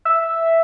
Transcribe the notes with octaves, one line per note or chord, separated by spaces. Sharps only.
E5